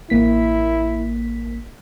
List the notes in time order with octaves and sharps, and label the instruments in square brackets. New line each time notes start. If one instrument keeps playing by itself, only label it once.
[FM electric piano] A1 A#3 B6 [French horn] E4